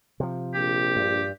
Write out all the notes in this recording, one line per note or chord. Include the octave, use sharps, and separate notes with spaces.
C3 F3
A#1 G4
G2